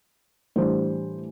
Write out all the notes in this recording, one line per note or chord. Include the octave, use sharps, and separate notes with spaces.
A2 E3 G3 D4 C5